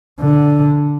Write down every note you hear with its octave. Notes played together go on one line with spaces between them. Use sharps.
D3